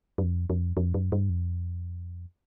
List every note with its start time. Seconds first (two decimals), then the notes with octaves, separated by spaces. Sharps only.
0.18 F#2
0.23 F2
0.50 F2
0.77 F2
0.94 F#2
1.12 G2
1.30 F2